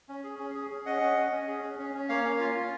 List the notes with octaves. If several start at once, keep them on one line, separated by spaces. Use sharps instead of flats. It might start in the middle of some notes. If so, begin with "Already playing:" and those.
C#4
G#4
C#4
G#4
G#4
C#4 D#5 F#5
C#4
C#4
C#4
G#4
C#4
C#4
C#4
A#3 C#5 F5
C#4
F4
F4